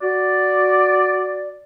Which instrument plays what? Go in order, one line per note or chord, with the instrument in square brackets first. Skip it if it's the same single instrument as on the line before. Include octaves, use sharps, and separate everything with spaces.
[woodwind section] F#4 D5